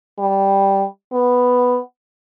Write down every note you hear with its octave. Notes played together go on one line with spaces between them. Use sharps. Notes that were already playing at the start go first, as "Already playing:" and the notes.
G3
B3